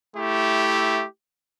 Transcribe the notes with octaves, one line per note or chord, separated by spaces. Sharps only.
A3 E4 G4